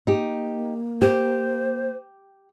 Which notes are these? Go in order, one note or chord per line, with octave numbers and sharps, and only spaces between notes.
A#3 D#4 G4
G4 C5